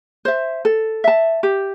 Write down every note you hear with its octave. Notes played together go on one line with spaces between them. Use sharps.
C5 E5
A4
E5 A5
G4